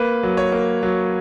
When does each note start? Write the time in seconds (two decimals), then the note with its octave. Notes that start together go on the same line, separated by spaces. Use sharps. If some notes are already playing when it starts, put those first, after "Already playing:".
Already playing: A#3 B4
0.23 F#3
0.37 C#5
0.52 A#3
0.83 F#3